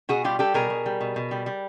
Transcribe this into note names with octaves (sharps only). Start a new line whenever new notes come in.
B2 F#4 G#4
G3 F4 G4
G3 G4 A4
B2 G#4 A#4
B2
G3
B2
B2
G3
G3